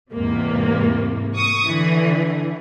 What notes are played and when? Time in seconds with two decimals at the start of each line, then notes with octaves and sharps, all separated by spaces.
0.13 E2 G#2 C3 A#3
1.36 C#6 D#6
1.67 D3 E3